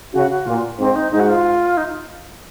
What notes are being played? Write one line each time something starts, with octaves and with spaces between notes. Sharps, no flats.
C#3 F#4
F#4
A#2 F4
G#2 C4
D#4
G#2 D#4
F#4
F4
D#4